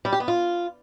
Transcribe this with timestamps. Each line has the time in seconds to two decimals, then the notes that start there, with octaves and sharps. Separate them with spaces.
0.05 G3
0.13 G4
0.20 B3
0.28 F4